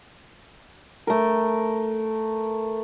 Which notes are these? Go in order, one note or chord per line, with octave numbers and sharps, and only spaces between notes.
A3 A#4